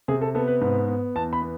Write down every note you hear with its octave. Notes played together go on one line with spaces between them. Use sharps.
C3 G#4
A4
B3 A4
B4
G#2 B4
B3
E2 A5
B5
B3